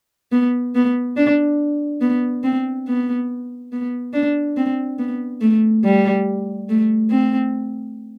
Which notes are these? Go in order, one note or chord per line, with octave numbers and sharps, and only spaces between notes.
B3
B3
D4
B3
C4
B3
B3
D4
C4
B3
A3
G3
A3
C4